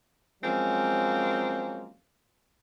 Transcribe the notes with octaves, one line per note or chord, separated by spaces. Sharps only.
F3 F#3 G#3 A#3 C4 C#4